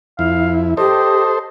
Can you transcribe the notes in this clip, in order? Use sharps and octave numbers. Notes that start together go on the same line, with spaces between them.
F2 E4 F5
G4 A4 C5 D#5